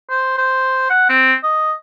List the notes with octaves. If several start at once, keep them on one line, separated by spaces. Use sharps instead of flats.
C5
C5
F#5
C4
D#5